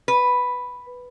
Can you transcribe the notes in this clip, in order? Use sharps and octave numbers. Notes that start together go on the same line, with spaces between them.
B4